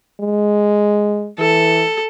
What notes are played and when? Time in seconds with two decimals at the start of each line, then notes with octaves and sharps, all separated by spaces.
0.20 G#3
1.39 E3 A4